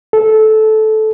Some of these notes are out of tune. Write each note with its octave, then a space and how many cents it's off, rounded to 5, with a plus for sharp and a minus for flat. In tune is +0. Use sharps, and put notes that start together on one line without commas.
A4 -15